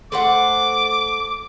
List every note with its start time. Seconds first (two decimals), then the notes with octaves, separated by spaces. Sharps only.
0.12 A3 C5 F#5 D6